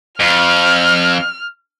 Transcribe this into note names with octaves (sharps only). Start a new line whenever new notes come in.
F2 F6